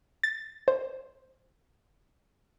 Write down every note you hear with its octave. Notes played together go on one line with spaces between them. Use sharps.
A6
C5